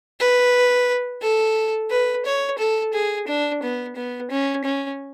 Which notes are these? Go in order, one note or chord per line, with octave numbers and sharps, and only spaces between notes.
B4
A4
B4
C#5
A4
G#4
D4
B3
B3
C#4
C#4